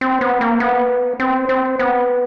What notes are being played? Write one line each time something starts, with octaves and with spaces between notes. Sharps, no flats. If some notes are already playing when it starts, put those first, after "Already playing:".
C4
B3
A#3
B3
C4
C4
B3